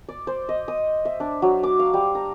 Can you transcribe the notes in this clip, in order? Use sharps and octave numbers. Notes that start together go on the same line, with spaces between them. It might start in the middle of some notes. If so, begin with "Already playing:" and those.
D5
C5
D#5
D#6
E5
D4
F#3
D6
F5
G3
A#5